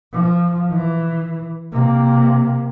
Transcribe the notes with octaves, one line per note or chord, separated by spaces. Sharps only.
F3
E3
C3 A#3